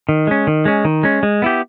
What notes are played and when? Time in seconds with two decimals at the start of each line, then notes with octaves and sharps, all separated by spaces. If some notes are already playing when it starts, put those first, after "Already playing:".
0.09 D#3
0.27 G#3 C#4
0.47 D#3
0.65 G#3 C#4
0.85 D#3
1.03 G#3 C#4
1.23 G#3
1.42 B3 E4 G4